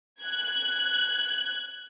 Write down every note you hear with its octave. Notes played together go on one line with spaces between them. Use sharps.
F#6 G#6